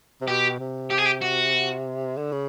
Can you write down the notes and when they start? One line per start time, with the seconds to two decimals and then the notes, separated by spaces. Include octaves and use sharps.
0.21 C3
0.28 B2 G4
0.59 C3
0.90 G4
0.98 G#4
1.05 G4
1.21 F#4
2.16 D3
2.32 C#3